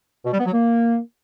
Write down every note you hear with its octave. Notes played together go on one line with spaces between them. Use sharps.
B2
G3
B3
F#3
A#3